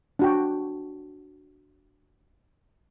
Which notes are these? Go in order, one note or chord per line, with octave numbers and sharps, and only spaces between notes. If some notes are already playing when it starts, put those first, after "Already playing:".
D4 F#4 G5